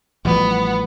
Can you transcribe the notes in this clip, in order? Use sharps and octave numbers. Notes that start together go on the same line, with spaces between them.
A1 F3 G3 B3